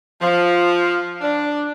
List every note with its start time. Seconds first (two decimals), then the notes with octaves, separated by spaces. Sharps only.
0.21 F3
1.21 D4